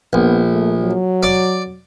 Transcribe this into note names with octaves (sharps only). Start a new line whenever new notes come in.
A#1 B3
A3
F#3
D5 D6